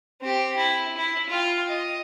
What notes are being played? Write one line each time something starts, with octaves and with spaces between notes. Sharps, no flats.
C4 G4
E4
E4
F4 G5
D#5